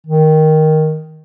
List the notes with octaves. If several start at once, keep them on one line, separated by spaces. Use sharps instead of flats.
D#3